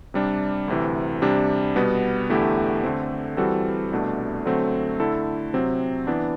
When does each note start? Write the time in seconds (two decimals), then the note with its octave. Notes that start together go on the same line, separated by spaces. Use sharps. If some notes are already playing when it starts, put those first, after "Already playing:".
0.14 C3 G3 D4
0.68 D2 C3 E3
1.22 C3 G3 D4
1.76 B2 G3 B3
2.29 E2 D3 A3 E4 G4
2.84 D3 A3 C4
3.37 E3 G3 C4 F#4 A4
3.92 C2 B2 A3 D4
4.46 D3 F#3 A3 C4
5.00 D3 A3 E4 A4
5.54 C3 F#3 C4
6.07 E3 B3 D4